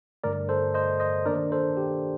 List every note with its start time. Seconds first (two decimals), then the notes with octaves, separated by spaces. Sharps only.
0.24 G2 D3 A3 A#4 D5
0.49 A4 C5
0.74 C5 D#5
1.00 C5 D#5
1.26 D#3 A#3 D4 A#4 D5
1.52 A4 C5
1.77 G4